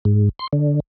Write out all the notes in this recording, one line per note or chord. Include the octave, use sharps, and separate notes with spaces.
G#2
C6
D3